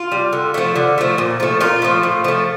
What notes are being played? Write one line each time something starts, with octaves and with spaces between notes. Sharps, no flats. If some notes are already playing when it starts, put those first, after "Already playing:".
Already playing: F4
G3
D3
F3 A3
D3
F3 A3
A#2
F3 A3
A#2 F4
F3 A3
A2
F3 A3